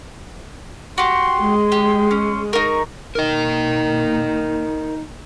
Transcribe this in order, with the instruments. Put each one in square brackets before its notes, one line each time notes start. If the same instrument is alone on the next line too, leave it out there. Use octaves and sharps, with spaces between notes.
[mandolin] F#4 G4 [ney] C6
[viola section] G#3
[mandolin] G4
C#4
[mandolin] D#4 A#4 [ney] C#6
[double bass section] B2 A#3 [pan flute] D#4 [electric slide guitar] A#4 D#5